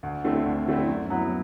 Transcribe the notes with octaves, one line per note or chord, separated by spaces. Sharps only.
D2
D3 A3 C4 E4
D2
D3 A3 C4 E4
F#2
F#3 B3 E4